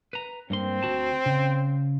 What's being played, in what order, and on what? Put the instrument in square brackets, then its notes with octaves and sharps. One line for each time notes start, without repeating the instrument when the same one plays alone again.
[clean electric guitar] B4 A#5
[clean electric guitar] G2 A#3 C6 [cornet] C4
[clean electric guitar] D2 F#4 A5
C#3